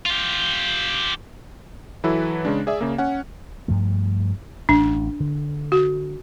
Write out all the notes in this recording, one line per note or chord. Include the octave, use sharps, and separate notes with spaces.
F4 G4
E3 F#3 E4 A4 B4
C#3 G#3 D4
G#4 D5 E5
C#3 A#3
C#4 F#5
G2 F3 A3
A1 D4
D3
F#4